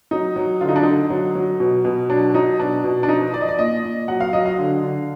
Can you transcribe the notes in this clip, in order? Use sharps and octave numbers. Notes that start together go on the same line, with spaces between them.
F#3 D#4
F#3
D3 F4
D#4
D4
D3 D#4
F#3
F#3
B2
B2
F#3 D4
F#3 D#4
B2 D4
B2
D4
F3 D#4
F3 D5
D#5
D5
A#2 D#5
A#2
F#3 F#5
F5
F#3 D#5
F5
D3
D3